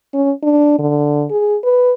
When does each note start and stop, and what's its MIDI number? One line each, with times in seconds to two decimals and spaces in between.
0.14 0.32 61
0.43 0.78 62
0.79 1.25 50
1.31 1.57 68
1.63 1.94 71